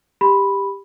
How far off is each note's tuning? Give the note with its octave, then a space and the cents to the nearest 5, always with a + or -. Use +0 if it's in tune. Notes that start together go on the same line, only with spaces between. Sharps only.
G4 +10 B5 +0